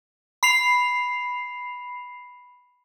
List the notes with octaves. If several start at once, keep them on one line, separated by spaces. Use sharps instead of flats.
B5 C7 F7